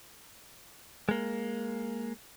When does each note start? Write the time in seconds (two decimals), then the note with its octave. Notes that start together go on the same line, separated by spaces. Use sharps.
1.09 G#3 A#3